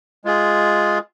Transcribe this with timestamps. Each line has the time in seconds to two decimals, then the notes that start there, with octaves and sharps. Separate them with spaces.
0.25 G#3 F4 G#4